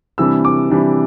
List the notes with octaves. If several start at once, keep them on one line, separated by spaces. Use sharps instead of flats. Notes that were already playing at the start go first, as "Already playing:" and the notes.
C3 E3 G3 D4 E6
D6
C3 E3 G3 D4